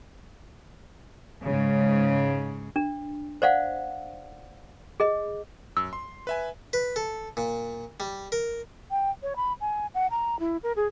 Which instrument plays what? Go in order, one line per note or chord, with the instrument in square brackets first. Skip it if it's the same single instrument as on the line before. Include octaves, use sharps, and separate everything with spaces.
[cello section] G#2 C#3
[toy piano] D4
C5 D5 F5 F#5
G#4 D#5
[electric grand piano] F#2 [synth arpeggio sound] E6
[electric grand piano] C6
B4 E5 G#5
[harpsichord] B4
A4
A#2
G3
A#4
[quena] G5
C#5
B5
G#5
F#5
A#5
E4
A#4
G#4